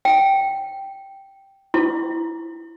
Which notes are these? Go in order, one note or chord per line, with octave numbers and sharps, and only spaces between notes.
G5
E4